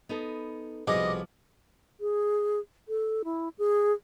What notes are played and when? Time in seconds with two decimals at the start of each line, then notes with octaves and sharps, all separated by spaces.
0.09 B3 D#4 A4
0.87 C2 B2 F3 G#4 D#5 D6
2.00 G#4
2.88 A4
3.24 E4
3.58 G#4